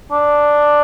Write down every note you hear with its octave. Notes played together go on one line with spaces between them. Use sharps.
D4